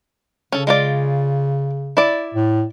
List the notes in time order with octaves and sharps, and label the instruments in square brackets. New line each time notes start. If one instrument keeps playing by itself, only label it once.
[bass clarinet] C#3 [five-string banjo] C#4 A4
[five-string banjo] G#3 F4 D5
E4 D5
[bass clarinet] A2